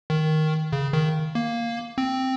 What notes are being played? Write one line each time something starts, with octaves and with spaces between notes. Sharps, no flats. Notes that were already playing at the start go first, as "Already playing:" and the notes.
D#3
C#3
D#3
A#3
C4